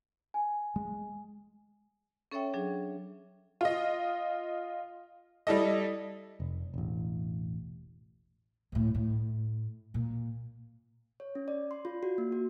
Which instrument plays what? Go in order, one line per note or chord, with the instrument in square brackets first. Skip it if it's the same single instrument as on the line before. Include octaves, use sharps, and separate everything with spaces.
[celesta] G#5
[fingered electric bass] G#3
[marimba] C#4 A4 C#5 E5 G5
F#3 D4 G#4
[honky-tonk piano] F4 D#5
G3 E4 A4 D#5
[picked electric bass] F1
E1 A1
[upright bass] D2 A2
A2
A#2
[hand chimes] C#5
C#4
D5
C6
F4
F#4
A#3
F#4